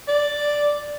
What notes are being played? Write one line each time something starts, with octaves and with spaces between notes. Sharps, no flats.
D5